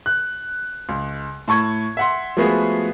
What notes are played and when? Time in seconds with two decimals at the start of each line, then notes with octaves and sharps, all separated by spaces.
0.06 F#6
0.89 C#2
1.48 A2 A5 C#6 G#6
1.97 E5 F#5 C6
2.37 F3 G#3 A3 B3 F#4 G#4